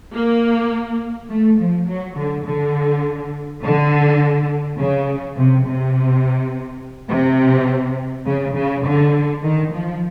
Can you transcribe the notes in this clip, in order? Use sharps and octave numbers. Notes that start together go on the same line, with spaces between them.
A#3
A3
F3
F#3
D3
D3
D3
C#3
C3
C3
C3
C#3
C#3
D3
D#3
F3